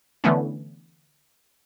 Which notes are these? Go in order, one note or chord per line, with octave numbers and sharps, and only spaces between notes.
D3 E3 A3 B3 C#4